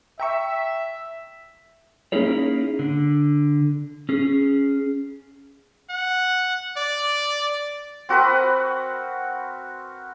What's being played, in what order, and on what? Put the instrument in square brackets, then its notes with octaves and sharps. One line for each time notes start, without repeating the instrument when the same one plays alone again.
[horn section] E5 [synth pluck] G5 A#5 C#6
[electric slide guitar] A#3 C#4 D#4 E4 G#4 C#5
D3
C#4 G#4
[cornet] F#5
D5
[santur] C4 F#4 A#4 B4